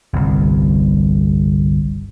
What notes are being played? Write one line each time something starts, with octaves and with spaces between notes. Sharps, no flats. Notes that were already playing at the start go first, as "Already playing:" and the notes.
G1 C2